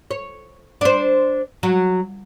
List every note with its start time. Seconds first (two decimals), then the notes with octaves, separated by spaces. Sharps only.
0.11 C#5
0.81 D4 C5
1.63 F#3